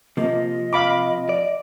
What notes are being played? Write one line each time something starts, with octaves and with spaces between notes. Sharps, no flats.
C3 F3 A#3 D#5
F5 B5 D6
D5